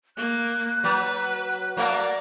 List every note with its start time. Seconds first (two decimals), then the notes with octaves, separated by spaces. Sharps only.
0.17 A#3 F#6
0.84 F#3 B4
1.77 F#3 A3 A#3 A#4 D5